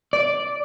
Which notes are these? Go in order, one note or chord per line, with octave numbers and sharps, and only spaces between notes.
D5